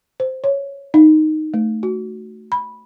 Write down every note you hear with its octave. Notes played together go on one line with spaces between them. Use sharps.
C5
C#5
D#4
A3
F#4
B5